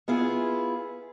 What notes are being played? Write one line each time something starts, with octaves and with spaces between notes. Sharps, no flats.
B3 E4 F4 G#4